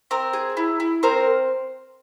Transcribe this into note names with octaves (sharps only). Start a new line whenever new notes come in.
C4 A#4
G#4
E4
E4
C4 A#4 C5